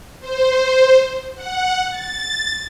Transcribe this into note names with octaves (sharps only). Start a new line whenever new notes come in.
C5
F#5
A6